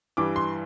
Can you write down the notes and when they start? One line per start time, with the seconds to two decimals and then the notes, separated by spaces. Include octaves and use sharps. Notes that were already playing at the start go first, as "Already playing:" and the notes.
0.17 G2 E3 G3 D6
0.36 C6